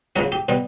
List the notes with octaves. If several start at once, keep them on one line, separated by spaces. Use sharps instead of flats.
C#2 C#3 F#3 F#4
G4
B2 G3